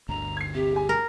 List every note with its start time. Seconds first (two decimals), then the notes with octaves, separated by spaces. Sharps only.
0.09 G1 D2 D3 A#5
0.37 G#6 C7
0.54 C3 G4
0.72 G#4 G#5
0.89 A#4